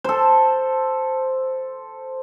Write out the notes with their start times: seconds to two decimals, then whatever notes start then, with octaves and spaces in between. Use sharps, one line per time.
0.04 A4 C5